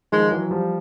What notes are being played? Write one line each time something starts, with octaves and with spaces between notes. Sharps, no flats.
D#3 F3 G#3
E3 F#3
F3 G3